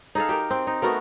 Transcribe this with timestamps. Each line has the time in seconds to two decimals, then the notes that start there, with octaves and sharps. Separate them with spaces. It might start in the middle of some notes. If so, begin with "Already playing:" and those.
0.15 D#4 G#4 A4 F5
0.29 G4 A#4
0.50 C4
0.67 D#4
0.82 A3 B3 F#4 A#4